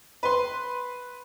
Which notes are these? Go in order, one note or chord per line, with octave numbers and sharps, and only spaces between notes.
B4 C6